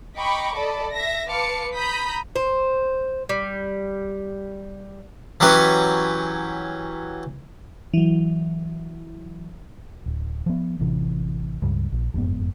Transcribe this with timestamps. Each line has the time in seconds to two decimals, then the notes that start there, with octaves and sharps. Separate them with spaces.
0.16 D#5 G5 A#5 B5 C#6 D6
0.55 A4 D5 D#5 B5
0.92 E5 A#6
1.28 B4 F5 A5 C6 D6 C#7
1.75 A#5 B5 D#6 G6 B6
2.36 C5
3.29 G3
5.40 E3 F#3 C#4 G4 B4
7.94 E3 F#3
10.06 D1
10.46 F3 B3
10.79 A1 C3 E3
11.62 C#2 G2
11.92 A#1
12.14 F#1 F2 G#2 B3